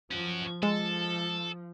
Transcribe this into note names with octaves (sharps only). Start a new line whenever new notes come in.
F3 C#4 F#4
F3 G#3 A4